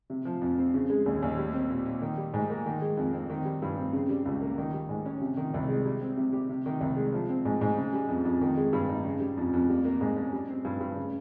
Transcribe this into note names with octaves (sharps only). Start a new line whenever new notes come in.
C3
F3
F2
C4
C#3
G#3
D#2
D#2
G3
C4
A#2
A#2
D#3
G3
G#2
A#3
D#3
G#3
F2
C4
D#3
G3
G2
C4
C#3
G3
C#2
A#3
D#3
G3
G#2
C#4
C3
D#3
C2
G#3
G3
C4
C3
G4
C3
D#3
C2
G#3
F3
C4
G#2
G#2
C#3
G3
F2
F2
D#3
G#3
G2
D#4
C#3
G3
F2
F2
G3
A#3
G#2
C#4
G3
C4
G2
G2
C#3